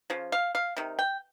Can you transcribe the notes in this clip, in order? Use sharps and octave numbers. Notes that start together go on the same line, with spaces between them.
C#3 F3
F5
F5
C3 D#3
G5